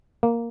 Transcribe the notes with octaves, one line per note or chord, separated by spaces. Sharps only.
A#3